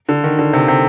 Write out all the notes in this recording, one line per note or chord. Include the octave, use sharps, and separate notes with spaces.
D3
D#3
D3
C3
C3